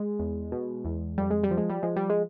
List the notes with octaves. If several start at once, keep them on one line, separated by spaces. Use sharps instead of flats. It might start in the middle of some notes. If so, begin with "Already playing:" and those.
Already playing: G#3
E2
B2
E2
F2 G3
G#3
G3
F3
G#3
G3
F3 G#3
G3
G#3